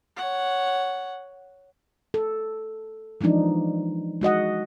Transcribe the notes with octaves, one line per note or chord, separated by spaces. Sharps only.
C#5 F#5
A4
E3 F3 G#3 D4 D#4
G#3 F#4 D#5 F#5